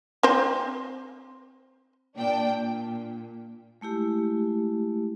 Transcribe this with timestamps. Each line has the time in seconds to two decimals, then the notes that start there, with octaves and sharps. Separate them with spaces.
0.23 C4 C5
2.17 A#2 D4 G5
2.61 A#2
3.81 G#3 A3 E4 G4